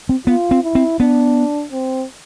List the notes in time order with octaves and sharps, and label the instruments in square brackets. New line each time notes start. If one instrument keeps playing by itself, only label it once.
[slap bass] C4
[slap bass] B3 [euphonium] F4
[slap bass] C4
[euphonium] E4
[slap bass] C4
[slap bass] B3 [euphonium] D4
[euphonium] C4